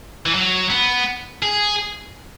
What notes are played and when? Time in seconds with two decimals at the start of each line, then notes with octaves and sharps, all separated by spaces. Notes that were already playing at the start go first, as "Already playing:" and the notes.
0.26 E3
0.34 F#3
0.70 B3
1.42 G#4